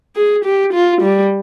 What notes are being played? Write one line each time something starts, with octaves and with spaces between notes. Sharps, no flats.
G#4
G4
F4
G3